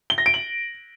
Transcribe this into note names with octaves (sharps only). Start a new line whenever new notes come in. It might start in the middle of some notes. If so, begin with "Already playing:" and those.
G7
A#6
D7
F#7